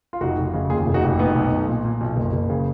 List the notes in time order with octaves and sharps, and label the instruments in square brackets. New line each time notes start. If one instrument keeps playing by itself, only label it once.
[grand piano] F4
F1 D#4 F#4
F1
C#3
D#2 F4 G#4
F1
D#4 F#4
F1
A#2 B3 D#4
B1
B1
A#2
A#2
B1
F#1
F#1
C#3